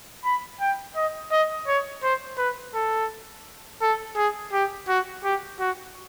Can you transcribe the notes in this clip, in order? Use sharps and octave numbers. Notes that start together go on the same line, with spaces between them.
B5
G5
D#5
D#5
C#5
C5
B4
A4
A4
G#4
G4
F#4
G4
F#4